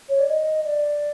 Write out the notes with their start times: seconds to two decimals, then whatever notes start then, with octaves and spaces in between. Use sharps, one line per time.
0.09 C#5
0.19 D5
0.28 D#5
0.64 D5